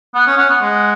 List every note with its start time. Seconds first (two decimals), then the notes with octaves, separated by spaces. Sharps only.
0.15 B3 F#5
0.27 C#4
0.37 C#4 F#5
0.49 B3
0.61 G#3